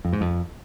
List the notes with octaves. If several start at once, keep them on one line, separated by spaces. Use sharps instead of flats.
F2
G#2
F2